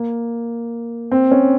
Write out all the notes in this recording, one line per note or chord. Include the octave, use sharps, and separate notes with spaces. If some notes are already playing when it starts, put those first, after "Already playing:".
Already playing: A#3
C4
C#4